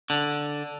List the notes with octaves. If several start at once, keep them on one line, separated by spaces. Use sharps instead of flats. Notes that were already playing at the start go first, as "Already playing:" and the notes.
D3